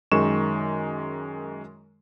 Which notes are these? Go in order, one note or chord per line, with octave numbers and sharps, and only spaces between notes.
F#2 D#3 G#3 C#6 E7